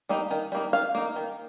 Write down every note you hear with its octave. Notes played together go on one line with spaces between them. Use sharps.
G3 A#3 D#4
D#3
G3 A#3 D#4
D#3 F5
A#3 D#4
D#3